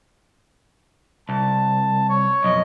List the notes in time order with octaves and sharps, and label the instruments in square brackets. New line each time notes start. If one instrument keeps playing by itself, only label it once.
[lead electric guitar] C2 [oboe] A5
[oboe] C#5
[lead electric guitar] B1 F2 [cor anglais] D#5